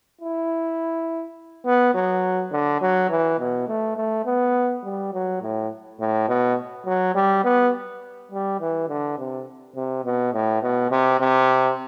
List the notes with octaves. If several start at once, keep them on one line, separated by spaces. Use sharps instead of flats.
E4
B3
F#3
D3
F#3
E3
B2
A3
A3
B3
G3
F#3
A2
A2
B2
F#3
G3
B3
G3
E3
D3
C3
C3
B2
A2
B2
C3
C3